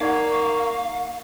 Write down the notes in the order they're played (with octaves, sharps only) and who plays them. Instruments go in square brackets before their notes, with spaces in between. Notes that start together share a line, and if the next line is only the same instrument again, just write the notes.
[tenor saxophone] A#3 [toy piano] D#4 D5 F#5 [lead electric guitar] F5 [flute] C#6